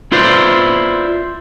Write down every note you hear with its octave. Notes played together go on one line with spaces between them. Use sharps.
E4 F4 B4 C5 D5 F5